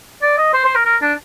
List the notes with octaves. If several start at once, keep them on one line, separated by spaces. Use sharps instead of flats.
D5
D#5
C5
C5
A#4
A#4
D4